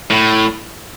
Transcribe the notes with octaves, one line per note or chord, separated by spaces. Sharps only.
A2